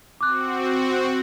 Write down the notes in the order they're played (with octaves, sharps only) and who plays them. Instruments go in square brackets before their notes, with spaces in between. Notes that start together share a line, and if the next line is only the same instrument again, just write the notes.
[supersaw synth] C4 F#4 [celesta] D6 F#6